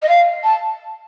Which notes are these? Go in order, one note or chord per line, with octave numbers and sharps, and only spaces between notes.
D#5
F5
A5